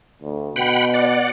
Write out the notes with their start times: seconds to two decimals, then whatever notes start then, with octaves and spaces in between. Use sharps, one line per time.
0.22 D2
0.56 B2 F#5 G5 B5
0.94 D5 F#5